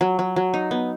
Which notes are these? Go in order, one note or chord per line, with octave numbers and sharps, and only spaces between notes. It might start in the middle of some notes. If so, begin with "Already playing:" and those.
F#3
F#3
F#3
D#4
B3